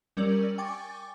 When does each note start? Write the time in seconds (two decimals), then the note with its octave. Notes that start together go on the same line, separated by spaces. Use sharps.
0.17 G3 C#4 A#4 D5 E6 F#7
0.58 G5 G#5 C#6 D6 A6